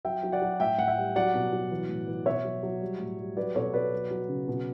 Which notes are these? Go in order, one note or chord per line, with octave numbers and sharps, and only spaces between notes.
F#3 E5 G5
F#3
D5 F#5
F#3
A2 E5 G5
A2 F#5
E5 G5
G3
F#3 D5 F#5
B2
F#3
E3
A2
E3
B2 C#5 E5
F#3
F#3
G3
A2
G3
F#3 B4 D5
B2 A4 C#5
B2 B4 D5
F#3
F#3
C#3
B2